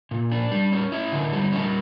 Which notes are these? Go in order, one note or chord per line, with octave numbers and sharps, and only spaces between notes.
A#2
D4
G3
C#4
E4
D3
G3
C#4